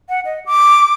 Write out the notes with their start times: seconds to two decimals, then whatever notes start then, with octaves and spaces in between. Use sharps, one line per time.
0.09 F#5
0.25 D#5
0.46 D6